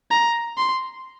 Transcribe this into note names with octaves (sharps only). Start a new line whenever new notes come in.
A#5
C6